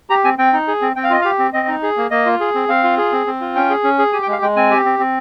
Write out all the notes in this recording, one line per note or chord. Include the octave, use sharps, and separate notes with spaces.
G4 A#5
C4 G#5
C4 G5
D#4
G#4
C4
C4 G5
F5
F4 D#5
G4 F5
C4
C4 D#5
D#4
G#4
A#3
A#3 D#5
F4
G#4
C4
C4 F5
F4
G#4
C4
C4
F4
C#4 G5
G#4
C#4
G#4
G4 G#5
G5
G#3 F5
G#3 G5
C4 G#5
G4
C4
C4